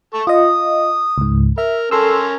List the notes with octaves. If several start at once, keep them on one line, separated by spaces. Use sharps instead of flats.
A4 C#6
F4 D#5 D#6
C#2 G#2
A#4 E5
C#4 A4 A#4 C6 E6